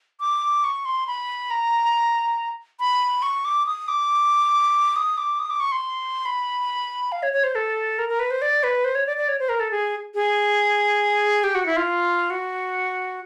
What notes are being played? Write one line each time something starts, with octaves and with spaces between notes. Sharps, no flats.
D6
C#6
C6
B5
A#5
B5
C#6
D6
D#6
D6
D#6
D6
D#6
D6
C#6
C6
B5
F5
C#5
C#5
C5
A4
A#4
A#4
B4
C5
D5
B4
C5
C#5
D5
D5
C#5
C5
A#4
A4
G#4
G#4
G4
F#4
E4
F4
F#4